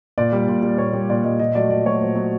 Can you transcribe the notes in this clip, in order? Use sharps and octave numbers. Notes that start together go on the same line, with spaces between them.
A#2 D5
G3
A#2
G3
A#2 C#5
G3
A#2 D5
G3 D#5
A#2 D#5
F#3 A3 D5
A#2 D5
F#3 A3 C#5
A#2 C5
F#3 A3